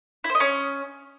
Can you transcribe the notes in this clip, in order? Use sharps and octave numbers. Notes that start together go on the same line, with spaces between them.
E4
C5
D#5
C#4